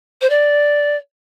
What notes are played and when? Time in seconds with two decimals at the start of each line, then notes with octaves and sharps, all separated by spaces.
0.21 C5
0.29 D5